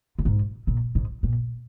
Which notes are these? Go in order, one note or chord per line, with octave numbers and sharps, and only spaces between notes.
F#2
G#2
A#2
G#2
A#2